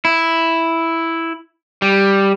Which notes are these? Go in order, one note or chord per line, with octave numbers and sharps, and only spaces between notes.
E4
G3